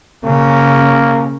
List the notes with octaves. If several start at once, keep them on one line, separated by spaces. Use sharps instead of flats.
C#3 A#3 C#4